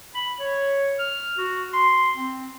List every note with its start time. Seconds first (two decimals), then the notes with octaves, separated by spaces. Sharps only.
0.15 B5
0.40 C#5
0.99 F6
1.37 F#4
1.73 C6
2.16 C4